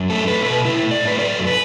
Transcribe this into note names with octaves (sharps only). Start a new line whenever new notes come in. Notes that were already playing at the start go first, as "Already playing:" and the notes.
Already playing: F#2
A3 A4
A3 B4
B2 B4
A2 E4
A2
D5
A3
B4
F#3 D5
F#2
B4